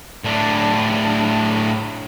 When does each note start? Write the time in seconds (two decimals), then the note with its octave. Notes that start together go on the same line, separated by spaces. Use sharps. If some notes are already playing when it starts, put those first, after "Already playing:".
0.24 A2 D4